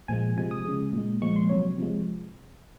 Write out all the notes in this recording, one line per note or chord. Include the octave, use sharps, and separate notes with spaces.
A#2 F3 G#3 G#5
C3 F3 G#3 G#5
D#6
C#3 G#3
A#2 G#3
A#2 F3 G#3 C#6
C6
C3 F#3 C#5
C3 F3 G#3